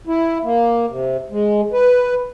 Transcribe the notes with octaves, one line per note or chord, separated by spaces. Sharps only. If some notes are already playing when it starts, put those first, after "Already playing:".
E4
A#3
C3
G#3
B4